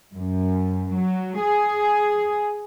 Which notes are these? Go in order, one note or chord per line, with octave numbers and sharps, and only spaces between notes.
F#2
F#3
G#4